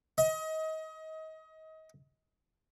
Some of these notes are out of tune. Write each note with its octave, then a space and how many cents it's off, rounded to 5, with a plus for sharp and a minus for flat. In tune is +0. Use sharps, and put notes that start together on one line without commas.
D#5 +30